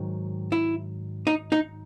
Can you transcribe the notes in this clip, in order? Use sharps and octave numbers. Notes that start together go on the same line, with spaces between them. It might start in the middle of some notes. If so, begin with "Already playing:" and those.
Already playing: G#2 D#3 F#3
E4
D#4
D#4